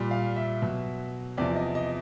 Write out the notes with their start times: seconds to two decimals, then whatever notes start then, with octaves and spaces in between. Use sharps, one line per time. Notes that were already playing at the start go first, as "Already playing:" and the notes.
Already playing: A#2 G3
0.11 F5
0.36 E5
0.62 B2 F#3
1.37 E2 C3 F3 D5
1.56 D#5
1.75 D#5